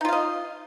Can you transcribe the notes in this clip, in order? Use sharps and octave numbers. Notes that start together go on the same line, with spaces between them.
D#4 F4 D#5 F5